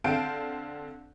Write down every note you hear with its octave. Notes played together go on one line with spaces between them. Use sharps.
D3 C4 F5 A5 G6 D7